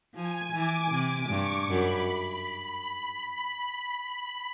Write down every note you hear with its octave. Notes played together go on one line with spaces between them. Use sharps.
F3 G#5
E3 D6
C3 D6
G2 C#6
F#2 B5